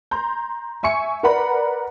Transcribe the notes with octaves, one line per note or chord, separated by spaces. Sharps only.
A#5 C6 G6
E5 G#5 C#6 C#7
A#4 B4 D5 F#5 A#5 B5